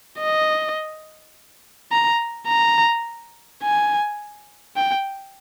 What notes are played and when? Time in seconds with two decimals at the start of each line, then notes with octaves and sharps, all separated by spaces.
0.20 D#5
1.92 A#5
2.48 A#5
3.63 G#5
4.77 G5